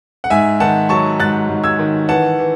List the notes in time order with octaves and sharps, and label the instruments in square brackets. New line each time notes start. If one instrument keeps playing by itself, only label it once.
[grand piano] F#5
G#2 E5 G#5
D#3 F#5 A5
F#3 A5 C#6
G#2 F#6 A6
G#2
E6 G#6
D#3
E3 F#5 A5
E3